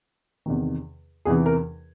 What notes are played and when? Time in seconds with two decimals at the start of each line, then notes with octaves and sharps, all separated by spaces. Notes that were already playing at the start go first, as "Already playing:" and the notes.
0.46 E2 C3 D#3
1.25 E2 C3 E3 G#4
1.46 A#4